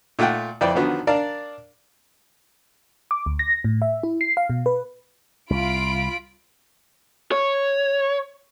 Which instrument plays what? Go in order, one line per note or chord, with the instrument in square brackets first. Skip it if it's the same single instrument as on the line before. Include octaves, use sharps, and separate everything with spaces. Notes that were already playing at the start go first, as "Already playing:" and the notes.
[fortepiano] A#2 A3 F4 F#5 G5
F2 E4 B4 C5 D5 G5
D3 D#3 F3 F#3 B3 F#4
D4 A#4 D5 F5 A5
[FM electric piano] D6
D2
A#6
A2
E5
E4
C7
F5
B2
B4
[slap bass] C2 [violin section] F4 B5 D7
[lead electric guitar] C#5